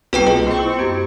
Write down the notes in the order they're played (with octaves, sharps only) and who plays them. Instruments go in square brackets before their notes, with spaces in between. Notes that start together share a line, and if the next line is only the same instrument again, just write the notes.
[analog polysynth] C2 [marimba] A#3 [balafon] C4 F4 [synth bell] F#4 B4 G5
[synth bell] G#4 [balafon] D#5
[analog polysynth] C4 C#6 [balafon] D#5
[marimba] E4
[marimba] F#2 B3 G#6 [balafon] G4